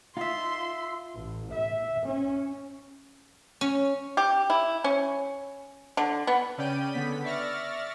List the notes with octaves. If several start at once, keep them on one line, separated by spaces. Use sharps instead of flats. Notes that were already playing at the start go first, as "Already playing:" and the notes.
D#4 F4 E5 C6
A1
E5
C#4
C#4
G4
E4
C#4
D3
B3
C#3 C#4 D5 G5 G6 D#7
D3 B3 B6
D5 E5 C#6 F6 A6 A#6